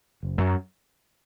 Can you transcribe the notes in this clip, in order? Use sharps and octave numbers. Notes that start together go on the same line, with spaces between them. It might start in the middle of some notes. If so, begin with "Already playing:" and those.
F#1
F#2 F#3